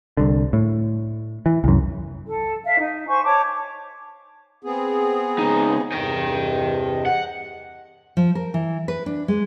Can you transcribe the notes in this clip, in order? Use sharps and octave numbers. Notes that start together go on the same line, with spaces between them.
C2 D3
A2
E3
C2 F#2
A4
E5 F5
D#4
C5 G#5 C#6
C#5 A5 D6
B3 C4 G#4
C#2 D#4
E2 G2 C3 D#5 G5
F#5
F3
A#4
E3
B4
D4
G#3